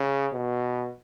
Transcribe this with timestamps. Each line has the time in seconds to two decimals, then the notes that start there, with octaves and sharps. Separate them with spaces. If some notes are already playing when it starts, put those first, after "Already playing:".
Already playing: C#3
0.33 B2